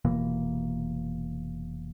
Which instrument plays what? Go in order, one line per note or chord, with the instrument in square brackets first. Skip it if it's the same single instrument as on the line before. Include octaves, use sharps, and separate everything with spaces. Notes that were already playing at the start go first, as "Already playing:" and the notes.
[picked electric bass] F1 B2 E3 A#3